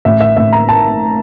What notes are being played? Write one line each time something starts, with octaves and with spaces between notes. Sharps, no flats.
A1 E5
E5
A1 E5
A#5
A5